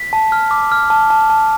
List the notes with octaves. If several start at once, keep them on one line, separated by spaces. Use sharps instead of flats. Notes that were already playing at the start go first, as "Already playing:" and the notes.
Already playing: B6
A5
F6
D6
F6
A5
A5
A5